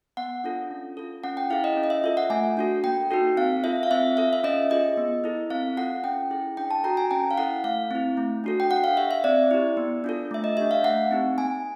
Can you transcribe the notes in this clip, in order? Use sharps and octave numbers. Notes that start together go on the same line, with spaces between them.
B3 F#5
D4 F4 A4
C#4
F4 A4
C#4 F#5
G5
E4 G#4 F5
D#5
C#4
D#5
E5
F4 A4 E5
F#5
A3 G#5
D4 F#4 A4
A#3 G5
D#4 F#4 A4
C4 F5
F4 A4 E5
F5
C4 E5
F4 A4 F5
E5
C#4 D#5
F4 G#4 D#5
B3
E4 A4
C4 F5
F4 A4 F#5
C#4 G5
E4 G#4
D4 G5
A5
F#4 A4 A#5
G#5
C#4 G5
F5
E4 A4 F#5
A3 F5
C4 E4
A3
D4 F#4 A4
G5
D4 F#5
F5
G4 E5
E5
C4 D5
E4 G4
B3
D4 F4 A4
A3 E5
D#5
D4 G4 E5
F5
A3 F#5
C4 D#4 G4
A#3 G#5